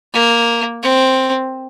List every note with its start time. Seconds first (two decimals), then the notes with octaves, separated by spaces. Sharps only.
0.14 A#3
0.83 C4